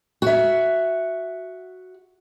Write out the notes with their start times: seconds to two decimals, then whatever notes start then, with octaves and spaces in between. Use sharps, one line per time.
0.22 F#4 E5